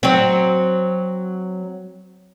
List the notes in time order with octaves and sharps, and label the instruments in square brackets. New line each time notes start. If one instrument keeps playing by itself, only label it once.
[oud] F#3 C4